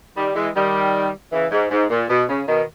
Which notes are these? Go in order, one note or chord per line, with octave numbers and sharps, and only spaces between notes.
D#3 G3
E3 G#3
D#3 G3
C#3 E3
G#2
G#2
A#2
B2
C#3
B2 D#3